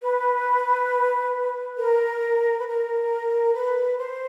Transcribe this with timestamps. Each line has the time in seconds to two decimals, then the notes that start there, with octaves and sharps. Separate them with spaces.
0.03 B4
1.78 A#4
2.58 B4
2.66 A#4
3.54 B4
3.98 C5